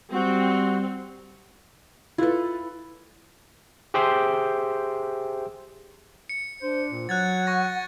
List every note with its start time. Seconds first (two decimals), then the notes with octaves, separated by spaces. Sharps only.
0.12 G3 C4 F#4
2.18 E4 F4 A4 B4
3.94 G4 G#4 C5 E5 G5 C6
6.29 C#7
6.62 D4 C5
6.90 A#2
7.09 F#3 F#5 F#6 G#6 A6
7.47 C#6 A#6